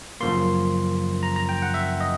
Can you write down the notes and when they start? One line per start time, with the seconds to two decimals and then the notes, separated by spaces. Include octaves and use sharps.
0.21 F#2 C#3 F3 A#3 C6
1.23 A#5
1.36 A#5
1.49 G5
1.62 F#5
1.74 E5
2.01 D#5